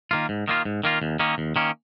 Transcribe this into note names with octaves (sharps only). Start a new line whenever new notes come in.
D#3 A#3 F4
G#2
D#3 A#3 F4
G#2
D#3 A#3 F4
D#2
D#3 A#3 C#4
D#2
D#3 A#3 C#4